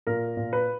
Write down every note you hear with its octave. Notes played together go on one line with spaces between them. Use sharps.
A#2 A#4
A#2
B4